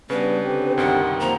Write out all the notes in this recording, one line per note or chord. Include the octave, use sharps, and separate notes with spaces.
C#3 G3 B3 D4 B4
D3 C4 G4
C2 F#2 D#3 F#5
F3 A#3 A#5